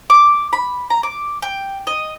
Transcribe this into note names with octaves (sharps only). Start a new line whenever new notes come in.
D6
B5
A#5
D6
G5
D#5